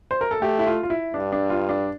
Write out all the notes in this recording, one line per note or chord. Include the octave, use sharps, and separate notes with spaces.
C5
A#4
A4
A3 G4
E4
F4
F4
E4
G2 D4
D4
F4
D4